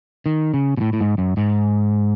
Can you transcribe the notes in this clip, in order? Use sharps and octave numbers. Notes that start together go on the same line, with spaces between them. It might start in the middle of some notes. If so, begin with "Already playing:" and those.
D#3
C#3
B2
A2
A2
G#2
F#2
G#2